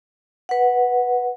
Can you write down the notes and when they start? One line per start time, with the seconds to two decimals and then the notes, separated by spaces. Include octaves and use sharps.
0.49 B4 F#5